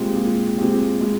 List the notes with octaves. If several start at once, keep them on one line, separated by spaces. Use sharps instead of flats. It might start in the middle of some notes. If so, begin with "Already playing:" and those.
Already playing: A#2 G#3 C4 G4
A#2
G#3 C4 G4
G#3